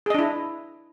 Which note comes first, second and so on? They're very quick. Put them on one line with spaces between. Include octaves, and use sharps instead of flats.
G#4 D#5 D4 E4